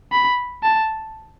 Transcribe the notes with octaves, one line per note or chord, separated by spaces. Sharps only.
B5
A5